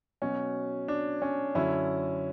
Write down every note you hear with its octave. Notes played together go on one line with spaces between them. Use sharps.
B2 F#3 C#4
D4
C#4
F#2 D3 F#3 C#4 E4